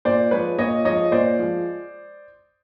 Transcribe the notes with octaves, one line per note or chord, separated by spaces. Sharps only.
A#2 C5 D5
F3 G#3 B4 C#5
A#2 C#5 D#5
F3 G#3 C#5 D#5
A#2 C5 D5
F3 G#3